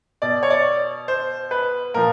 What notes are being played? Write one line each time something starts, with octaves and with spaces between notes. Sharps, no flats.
B2 D5
C#5
D5
C5
B4
A#2 F3 A#4